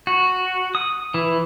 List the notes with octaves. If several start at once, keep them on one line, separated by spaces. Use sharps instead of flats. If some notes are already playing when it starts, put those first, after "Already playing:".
F#4
D#6
E3